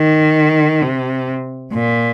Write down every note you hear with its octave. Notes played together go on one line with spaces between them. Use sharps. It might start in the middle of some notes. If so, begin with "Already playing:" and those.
Already playing: D#3
C3
A#2